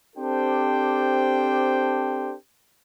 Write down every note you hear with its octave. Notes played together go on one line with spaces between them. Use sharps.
C4 D4 G4 A4 C5 G5